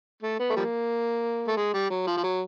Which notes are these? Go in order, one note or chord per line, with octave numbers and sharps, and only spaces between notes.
A3
B3
A3
F3 G3 A#3
A3
G#3
G3
F#3
F3
F3
F#3